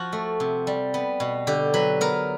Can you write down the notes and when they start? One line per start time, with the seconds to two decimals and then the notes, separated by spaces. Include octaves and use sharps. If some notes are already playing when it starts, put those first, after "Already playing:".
Already playing: F3 F#4
0.13 A3
0.40 C3
0.67 G3
0.94 B3
1.20 B2
1.47 D3 G4
1.74 F#3 B4
2.01 B3 A#4